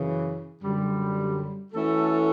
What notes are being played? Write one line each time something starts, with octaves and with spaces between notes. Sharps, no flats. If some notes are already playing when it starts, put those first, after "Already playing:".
Already playing: F#2 C#3 E3
F#2 D3 G3
E3 A3 C#4 F#4 A4